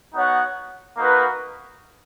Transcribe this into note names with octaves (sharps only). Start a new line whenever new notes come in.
B3 D#4 F#4 C#5 F#5
A#3 D#4 F#4 B4